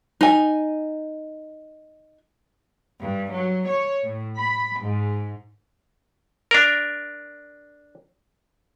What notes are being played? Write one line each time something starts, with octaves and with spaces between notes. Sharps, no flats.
D#4 G#5
G2
F#3
C#5
A2
B5
G#2
D4 A#4